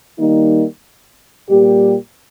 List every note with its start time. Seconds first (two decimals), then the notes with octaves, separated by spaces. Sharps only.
0.18 D#3 G3 A#3 D#4
1.49 A#2 G3 A#3 G4